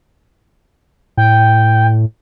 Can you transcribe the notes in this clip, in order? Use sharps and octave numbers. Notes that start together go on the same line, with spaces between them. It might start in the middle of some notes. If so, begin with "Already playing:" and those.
A2 G5